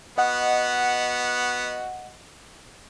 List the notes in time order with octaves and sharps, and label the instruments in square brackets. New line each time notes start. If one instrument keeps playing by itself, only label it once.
[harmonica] B3 F#4 [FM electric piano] D#5 F#5